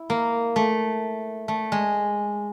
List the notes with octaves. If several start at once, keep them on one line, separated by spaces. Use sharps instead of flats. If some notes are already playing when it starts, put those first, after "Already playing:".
Already playing: E4
A#3
A3
A3
G#3